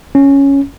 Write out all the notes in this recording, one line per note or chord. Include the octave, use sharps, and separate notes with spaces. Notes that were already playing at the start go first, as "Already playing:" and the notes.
C#4